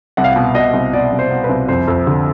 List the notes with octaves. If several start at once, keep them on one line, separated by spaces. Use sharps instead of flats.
C2 F#5
F5
B2 F#5
B2 D#5
C2
B2 D5
C2
C5
B2
B4
C2
F2 C5
F2
D3